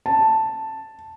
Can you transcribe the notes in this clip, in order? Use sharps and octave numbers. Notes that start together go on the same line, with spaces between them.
A5